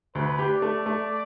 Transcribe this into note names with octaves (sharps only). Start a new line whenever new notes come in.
D2 B4
G4
D5
A3
A3